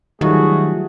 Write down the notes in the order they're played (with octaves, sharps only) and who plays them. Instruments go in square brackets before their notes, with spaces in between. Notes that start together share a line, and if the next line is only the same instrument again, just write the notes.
[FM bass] D#3 [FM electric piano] F#3 G3 F4 [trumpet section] A3 F#4 G#4